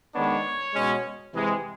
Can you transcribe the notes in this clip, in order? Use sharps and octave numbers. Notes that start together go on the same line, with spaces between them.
D#3 G#3 B3 D4 C#5
B2 G#3 C#4
C3 E3 G#3